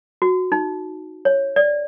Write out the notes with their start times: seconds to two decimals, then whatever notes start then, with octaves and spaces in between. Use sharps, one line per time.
0.22 F#4
0.52 D#4
1.25 C#5
1.56 D5